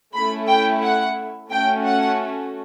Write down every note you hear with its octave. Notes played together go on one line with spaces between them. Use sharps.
A3 C#4 E4 B5
G5
F#5
A3 C#4 F#4 G5
F#5